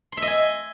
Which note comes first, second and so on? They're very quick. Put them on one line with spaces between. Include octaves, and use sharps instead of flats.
C6 E5 D#5 G#5